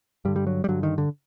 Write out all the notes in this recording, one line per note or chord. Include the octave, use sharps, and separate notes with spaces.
G2 D3 G3
G3
F#3
G3
G2 D3 F#3
D#3
D3